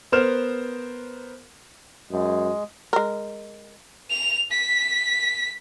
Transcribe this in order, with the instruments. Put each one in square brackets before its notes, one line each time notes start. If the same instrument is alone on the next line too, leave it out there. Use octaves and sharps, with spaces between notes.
[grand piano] B3 A#4 C5 F6 E7
[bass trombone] F#2 [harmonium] G#3
[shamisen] G#3 A#4
[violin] F7
B6